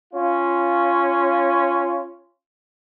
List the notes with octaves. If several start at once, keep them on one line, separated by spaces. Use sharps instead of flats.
C#4 F4